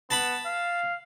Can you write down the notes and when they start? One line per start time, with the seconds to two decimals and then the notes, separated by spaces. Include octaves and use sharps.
0.11 B3 A5 B5
0.46 F5